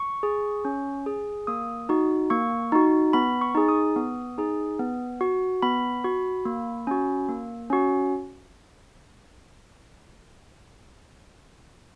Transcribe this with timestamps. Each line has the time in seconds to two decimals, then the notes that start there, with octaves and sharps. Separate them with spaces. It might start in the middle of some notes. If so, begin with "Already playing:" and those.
Already playing: C#6
0.23 G#4
0.65 C#4
1.06 G#4
1.47 A#3 D#6
1.89 D#4 F#4
2.30 A#3 C#6
2.72 D#4 F#4
3.13 B3 B5
3.41 C#6
3.55 D#4 G#4
3.69 D#6
3.96 B3
4.38 D#4 G#4
4.79 B3
5.21 F#4
5.62 B3 B5
6.04 F#4
6.45 A#3
6.87 C#4 F#4
7.28 A#3
7.70 C#4 F#4